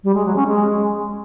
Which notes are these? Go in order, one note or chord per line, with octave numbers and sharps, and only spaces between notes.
G3
G#3
F#3
C#4
G#3